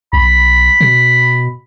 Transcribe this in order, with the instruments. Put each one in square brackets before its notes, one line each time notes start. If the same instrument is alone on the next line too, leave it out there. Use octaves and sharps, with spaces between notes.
[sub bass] B1 [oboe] B5
[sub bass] B2